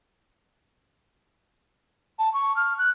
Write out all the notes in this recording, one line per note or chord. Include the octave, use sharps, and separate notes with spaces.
A5
C#6
F6
F#6